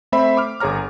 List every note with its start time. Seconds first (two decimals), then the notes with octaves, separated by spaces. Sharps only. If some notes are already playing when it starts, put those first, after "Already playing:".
0.12 A3 C4 C5 E5 B5
0.37 D6 F6
0.60 G1 G#4 C#5 A#5 F6